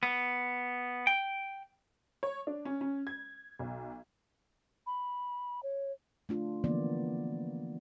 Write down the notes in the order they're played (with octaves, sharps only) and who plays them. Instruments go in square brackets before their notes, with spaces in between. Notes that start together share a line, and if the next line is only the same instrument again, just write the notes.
[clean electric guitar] B3
G5
[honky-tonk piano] C#5
D4
C#4
C#4
G#6
B1
[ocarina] B5
C#5
[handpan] A3 D4 F4
D3 E3 F3 A#3 B3 D5